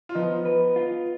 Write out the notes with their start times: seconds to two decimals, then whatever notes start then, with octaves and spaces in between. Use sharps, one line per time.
0.09 F4
0.15 F3 B3 D#4
0.45 B4
0.76 F4